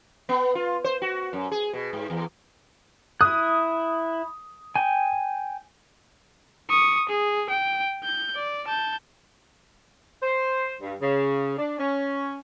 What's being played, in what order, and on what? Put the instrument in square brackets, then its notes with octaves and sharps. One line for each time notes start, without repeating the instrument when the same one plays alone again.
[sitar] B3
F4
C5
F#4
F#2
G#4
B2
G#2
E2
[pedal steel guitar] E4 F#6 [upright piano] D#6
[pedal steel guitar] G5 G#5
[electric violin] C#6 D#6
G#4
G5
G6
D5
A5 G6
[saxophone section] C5
G2
C#3
D4
C#4